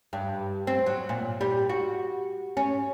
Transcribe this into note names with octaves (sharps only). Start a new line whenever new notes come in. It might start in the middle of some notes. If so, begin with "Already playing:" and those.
G2
C4
F#3
A#2
G3
F#4
C#4